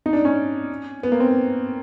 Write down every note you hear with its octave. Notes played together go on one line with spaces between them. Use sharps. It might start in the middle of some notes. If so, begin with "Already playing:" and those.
D#4
D4
C#4
B3
A#3
C4